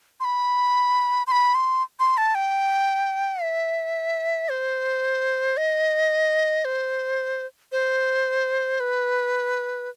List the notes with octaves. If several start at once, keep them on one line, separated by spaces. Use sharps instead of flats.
C6
B5
C6
B5
C6
C6
A5
G5
E5
C5
D#5
C5
C5
B4